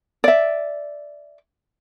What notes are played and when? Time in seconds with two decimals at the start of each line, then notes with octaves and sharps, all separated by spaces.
0.24 D5 E5